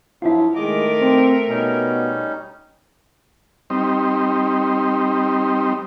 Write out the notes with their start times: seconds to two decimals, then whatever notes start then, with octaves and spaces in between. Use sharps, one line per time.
0.22 G2 F3 F#3 E4 F4
0.56 D#3 G#3 A3 A#4 D#5 D6
1.00 C4
1.49 B2 G3 C#4 D#4
3.70 G3 C4 D#4